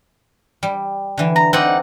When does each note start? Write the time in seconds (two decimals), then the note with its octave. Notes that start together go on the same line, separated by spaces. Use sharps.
0.63 G3
1.18 D3 E3
1.36 A#5
1.53 C4 D#4 D5 F#5